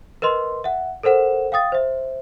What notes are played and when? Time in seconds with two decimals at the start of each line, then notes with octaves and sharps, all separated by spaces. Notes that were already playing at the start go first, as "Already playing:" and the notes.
0.22 A#4 B4 D#5 C6
0.64 E5 F#5
1.03 A4 A#4 C5 F#5 E7
1.52 F5 G5 D#6 A6
1.72 C5 E5